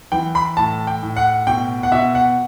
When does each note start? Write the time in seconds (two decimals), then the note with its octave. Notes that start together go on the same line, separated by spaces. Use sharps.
0.12 E3 G5
0.35 B5
0.57 A2 A5
0.87 G5
1.02 A2
1.16 F#5
1.47 B2 G5
1.83 F#5
1.92 B2 E5
2.15 F#5